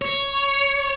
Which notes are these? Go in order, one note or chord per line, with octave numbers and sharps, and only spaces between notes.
C#5